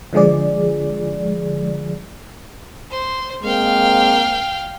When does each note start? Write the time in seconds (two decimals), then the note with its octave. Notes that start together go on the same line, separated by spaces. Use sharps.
0.13 D3 F3 G#3 G#4 D5
2.90 C5
3.44 G#3 A#3 C4 F5 G5